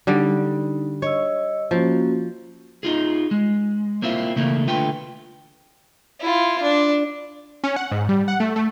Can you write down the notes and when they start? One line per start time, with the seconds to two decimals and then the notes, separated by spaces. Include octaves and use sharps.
0.07 D3 G3 D#4
1.02 C#5 D#5 E6
1.71 F3 A#3 C#4 F#4
2.83 D#4 F4 G#4
3.31 G#3
4.02 A#3 C4 E4 F4
4.36 C#3 E3 A3 A#3
4.68 D3 A3 F4 B4 G5
6.20 E4 F4
6.63 D4
7.64 C#4
7.76 F#5
7.92 G#2
8.09 G3
8.28 F#5
8.40 A3
8.56 A3